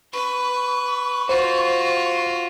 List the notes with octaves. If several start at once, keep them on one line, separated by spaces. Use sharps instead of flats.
B4 C#6
F4 F#4 C5